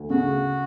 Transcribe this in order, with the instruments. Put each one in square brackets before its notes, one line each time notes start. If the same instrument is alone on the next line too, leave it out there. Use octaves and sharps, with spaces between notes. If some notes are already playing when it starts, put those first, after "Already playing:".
Already playing: [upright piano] D2
[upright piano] C#3 [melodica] F#4